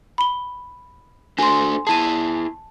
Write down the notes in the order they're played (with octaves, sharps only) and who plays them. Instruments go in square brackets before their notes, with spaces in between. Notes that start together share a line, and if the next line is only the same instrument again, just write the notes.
[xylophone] B5 G7
[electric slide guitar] D4 F#4 A4 [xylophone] G#5 C6
[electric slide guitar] E4 G#4 [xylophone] A5 D#7